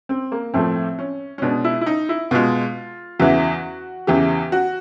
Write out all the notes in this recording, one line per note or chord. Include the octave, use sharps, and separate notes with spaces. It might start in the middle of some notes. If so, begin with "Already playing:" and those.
C4
A#3
A2 F3 A3 C4
C#4
C#4
B2 G#3 D4
E4
E4
D#4
E4
B2 G#3 F4
E2 C#3 E3 F#4
E2 C#3 E3 G4
F#4